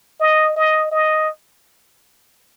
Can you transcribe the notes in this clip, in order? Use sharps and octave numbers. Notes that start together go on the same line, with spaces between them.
D#5
D#5
D#5